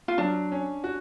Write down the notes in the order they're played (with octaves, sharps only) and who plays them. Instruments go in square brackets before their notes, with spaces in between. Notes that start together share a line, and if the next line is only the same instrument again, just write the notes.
[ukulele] F4
[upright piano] F#3 [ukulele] D4
[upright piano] C#4
F#4